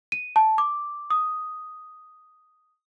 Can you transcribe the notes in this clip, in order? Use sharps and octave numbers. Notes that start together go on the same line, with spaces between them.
D#7
A5
D6
D#6